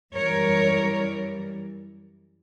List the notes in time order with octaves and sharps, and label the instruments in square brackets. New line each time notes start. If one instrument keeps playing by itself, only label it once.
[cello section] F#2 E3 G3 A#4 C#5